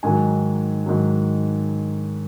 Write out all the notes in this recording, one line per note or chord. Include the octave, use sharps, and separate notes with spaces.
G#2 D#3 F#3 G#5
G#2 D#3 F#3